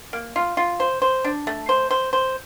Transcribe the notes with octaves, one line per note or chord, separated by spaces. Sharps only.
A#3
F4
F4
C5
C5
D4
A3
C5
C5
C5